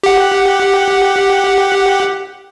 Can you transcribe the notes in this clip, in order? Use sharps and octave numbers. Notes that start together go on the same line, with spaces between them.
G4 F#5